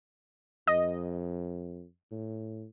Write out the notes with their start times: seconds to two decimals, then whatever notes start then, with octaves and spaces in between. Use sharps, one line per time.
0.67 F2 D#5
2.11 A2